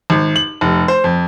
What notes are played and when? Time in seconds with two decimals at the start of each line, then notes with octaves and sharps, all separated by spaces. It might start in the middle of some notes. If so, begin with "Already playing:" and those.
0.10 G#1
0.36 F#7
0.61 F1
0.88 C5
1.04 F2